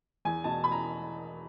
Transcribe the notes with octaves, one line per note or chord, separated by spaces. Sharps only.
E2 G#5
B2 A5
B5
A#5